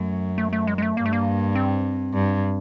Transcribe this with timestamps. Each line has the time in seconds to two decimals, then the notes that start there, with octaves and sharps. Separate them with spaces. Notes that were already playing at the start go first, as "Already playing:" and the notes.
Already playing: F#2 A3
0.38 A3
0.53 A3
0.67 G#3
0.78 G#3
0.82 A3
0.96 G2 A#3
1.06 A3
1.13 A#3
1.55 C4
2.14 G2